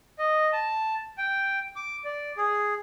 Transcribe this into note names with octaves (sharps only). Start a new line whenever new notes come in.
D#5
A5
G5
D6
D5
G#4